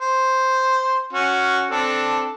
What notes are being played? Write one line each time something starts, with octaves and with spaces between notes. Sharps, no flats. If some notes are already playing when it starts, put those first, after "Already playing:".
C5
C#4 F#4
C4 D4 A4